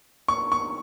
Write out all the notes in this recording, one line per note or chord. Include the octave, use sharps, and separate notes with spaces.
C#6
C#6